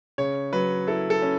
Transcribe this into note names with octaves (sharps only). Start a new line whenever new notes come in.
C#3 C#5
F#3 B4
E4 A4
A4
C#4